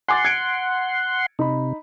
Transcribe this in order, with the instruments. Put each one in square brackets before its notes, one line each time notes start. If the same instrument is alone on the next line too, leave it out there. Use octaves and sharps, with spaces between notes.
[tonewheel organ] F#5 C6 [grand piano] G#5 D6 A6
[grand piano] G#6 C#7 D7
[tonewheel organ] C3 [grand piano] D#4 B5